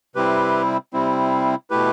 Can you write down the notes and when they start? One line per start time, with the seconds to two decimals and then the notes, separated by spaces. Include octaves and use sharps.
0.15 C3 G3 C4 E4 G4 B4
0.93 C3 G3 C4 E4
1.70 B2 A3 E4 G4 B4